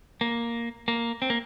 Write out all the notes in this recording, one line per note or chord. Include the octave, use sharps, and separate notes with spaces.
A#3
A#3
C4
A#3